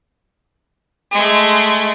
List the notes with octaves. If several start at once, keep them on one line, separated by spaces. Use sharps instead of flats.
G#3 A3